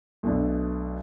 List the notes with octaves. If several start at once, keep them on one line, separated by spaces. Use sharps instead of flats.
B1 B2 A3 D4